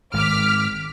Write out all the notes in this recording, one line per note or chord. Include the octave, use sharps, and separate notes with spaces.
G#1 G#3 D6 F6 B6